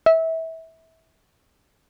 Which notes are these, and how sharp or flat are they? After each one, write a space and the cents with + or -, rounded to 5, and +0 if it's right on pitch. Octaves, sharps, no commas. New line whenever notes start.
E5 -25